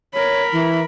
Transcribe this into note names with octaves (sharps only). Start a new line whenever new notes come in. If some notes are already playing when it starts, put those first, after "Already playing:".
A#4 C#5 B5
E3 E4